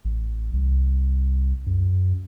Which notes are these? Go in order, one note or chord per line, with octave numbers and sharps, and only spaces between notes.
A1
C2
F#2